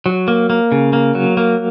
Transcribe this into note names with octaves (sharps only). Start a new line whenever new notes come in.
F#3
A#3
A#3
C#3
A#3
F#3
A#3